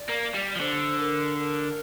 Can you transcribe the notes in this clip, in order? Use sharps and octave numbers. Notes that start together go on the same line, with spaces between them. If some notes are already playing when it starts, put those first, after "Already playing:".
Already playing: D5
A#3
G3
F3
D3 C5
A#4
A#4